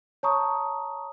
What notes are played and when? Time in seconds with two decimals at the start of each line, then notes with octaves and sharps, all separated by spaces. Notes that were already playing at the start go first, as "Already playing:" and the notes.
0.23 C#5 A5 A#5 C#6 D#6